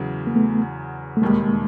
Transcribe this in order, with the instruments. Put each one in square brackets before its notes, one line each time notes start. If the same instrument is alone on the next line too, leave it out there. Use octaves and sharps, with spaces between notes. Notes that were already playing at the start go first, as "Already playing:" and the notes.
Already playing: [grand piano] E2 C#3 F#3
[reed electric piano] A#3
A3 B3
A3
[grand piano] E1 D#2 D#3 G3 [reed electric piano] G#3 A#3